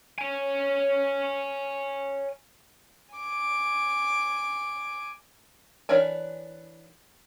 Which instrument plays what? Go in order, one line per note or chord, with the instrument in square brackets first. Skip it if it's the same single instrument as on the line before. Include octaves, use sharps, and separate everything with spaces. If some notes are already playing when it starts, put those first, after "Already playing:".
[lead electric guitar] C#5 G#5
[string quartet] G#5 D6
[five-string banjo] E3 D4 A#4 C#5 G#5